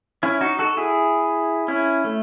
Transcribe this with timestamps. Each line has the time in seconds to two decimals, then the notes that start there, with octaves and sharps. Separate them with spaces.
0.23 C#4 E4
0.41 D#4 F#4
0.59 F#4 A4
0.77 E4 G#4
1.68 C#4 E4
2.04 A3